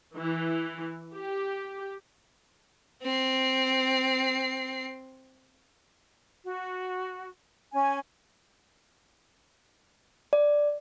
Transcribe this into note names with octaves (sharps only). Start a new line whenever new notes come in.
E3
G4
C4 C7
F#4
C#4 G#5
D5